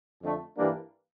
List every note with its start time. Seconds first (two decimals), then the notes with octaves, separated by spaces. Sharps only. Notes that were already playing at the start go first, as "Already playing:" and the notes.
0.22 F2 D3 A3
0.57 G2 E3 G3 A#3 D4